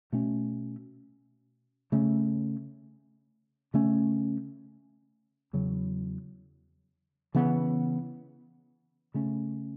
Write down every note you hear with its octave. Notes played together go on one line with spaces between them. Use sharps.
B2 A3 C#4
C#3 A3 C#4
C#3 A3 C#4
E2 C#3 F#3
C#3 E3 B3
C#3 A3 C#4